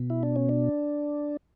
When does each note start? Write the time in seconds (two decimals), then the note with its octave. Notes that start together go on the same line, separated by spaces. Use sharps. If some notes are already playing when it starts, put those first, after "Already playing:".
Already playing: B2
0.10 E4
0.23 D4
0.36 C#4
0.49 D4